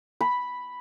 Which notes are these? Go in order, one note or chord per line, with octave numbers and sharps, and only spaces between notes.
B5